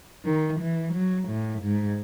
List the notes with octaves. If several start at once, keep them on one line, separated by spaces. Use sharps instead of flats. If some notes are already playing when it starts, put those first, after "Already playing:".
D#3
E3
F#3
A2
G#2